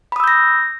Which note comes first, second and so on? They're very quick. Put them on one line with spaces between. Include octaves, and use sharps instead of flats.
B5 D#6 E6 G6 A#6